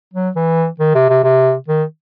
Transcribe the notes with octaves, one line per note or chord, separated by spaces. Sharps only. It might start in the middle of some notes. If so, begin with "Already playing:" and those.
F#3
E3
D#3
C3
C3
C3
D#3